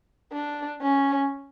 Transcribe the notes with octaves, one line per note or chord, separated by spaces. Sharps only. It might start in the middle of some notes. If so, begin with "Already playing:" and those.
D4
C#4